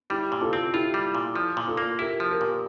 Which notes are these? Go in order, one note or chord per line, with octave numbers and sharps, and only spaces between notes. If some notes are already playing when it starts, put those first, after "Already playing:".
G3 E4 G4
A#2
F4 A4
C4
E4 F4 G4
G3
A#2
F3
A#2
F4 A4
A#3
E4 G4 A#4
F3
G4 A#4
A#2